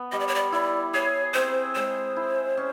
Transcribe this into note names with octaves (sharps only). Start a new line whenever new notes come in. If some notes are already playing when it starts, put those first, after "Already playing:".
Already playing: B3
G3 D#5
D5
C#5
D5
E4 D5
G#4 C#5
C4 C5
G#3 C5
E4
C#4